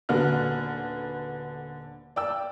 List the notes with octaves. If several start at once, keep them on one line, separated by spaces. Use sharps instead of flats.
D#1 D3 B3 F#4 F6
D5 G5 E6